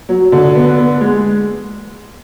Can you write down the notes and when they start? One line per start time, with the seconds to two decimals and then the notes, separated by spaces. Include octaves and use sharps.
0.09 F#3
0.32 D3
0.55 B3
0.78 B3
1.01 G#3